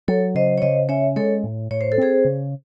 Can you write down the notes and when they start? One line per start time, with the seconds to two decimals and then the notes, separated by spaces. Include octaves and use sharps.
0.08 F#3 A4 C#5
0.35 C#3 C5 D#5
0.58 C#5
0.62 C#3 C5 D#5
0.89 C#4 C#5 E5
1.16 G#3 A4 C#5
1.44 A2
1.71 A2 C#5
1.81 C5
1.92 A4
1.98 C4 G#4 C5
2.25 C#3